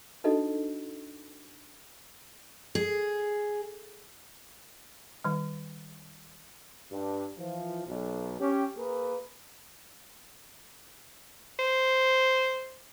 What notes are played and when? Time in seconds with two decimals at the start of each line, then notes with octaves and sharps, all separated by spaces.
0.24 D4 D#4 F#4 A4 D#5
2.75 G#4
5.24 D#3 G3
6.91 G2
7.38 E3 F3
7.87 B1
8.40 C#4 G4
8.77 A#3 G#4 A#4 B4
11.59 C5